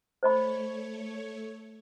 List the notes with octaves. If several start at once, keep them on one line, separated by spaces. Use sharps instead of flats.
A3 C5 C#5 D#5 B5